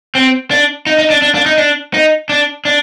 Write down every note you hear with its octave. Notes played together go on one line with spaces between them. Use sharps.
C4
D4
D#4
D#4
D4
D4
D4
D#4
D4
D#4
D4
D4